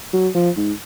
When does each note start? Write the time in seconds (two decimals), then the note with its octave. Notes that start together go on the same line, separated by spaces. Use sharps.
0.13 F#3
0.35 F3
0.57 G#2